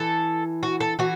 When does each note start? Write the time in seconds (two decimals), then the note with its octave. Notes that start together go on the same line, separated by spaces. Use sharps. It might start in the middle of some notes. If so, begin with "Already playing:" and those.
Already playing: E3 A4
0.63 F#4
0.80 A4
0.99 E3 F#4